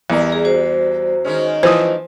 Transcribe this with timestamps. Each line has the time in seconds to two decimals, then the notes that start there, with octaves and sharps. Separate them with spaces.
0.10 E2 G3 A#4
0.32 G#4
0.45 F#4 C5
1.24 D#3 G#3 C#4
1.63 E3 F3 C5 D#6